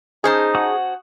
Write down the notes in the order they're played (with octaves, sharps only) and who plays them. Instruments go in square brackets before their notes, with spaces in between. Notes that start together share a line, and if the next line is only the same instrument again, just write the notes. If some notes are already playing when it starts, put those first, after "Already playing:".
[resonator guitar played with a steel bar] C#4 C5 A5 [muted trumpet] D#4 [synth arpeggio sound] G#4
[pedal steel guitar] F#4 F#5 D#6